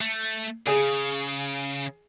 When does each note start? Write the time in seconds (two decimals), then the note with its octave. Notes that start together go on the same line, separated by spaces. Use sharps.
0.01 A3
0.67 C#3 G#4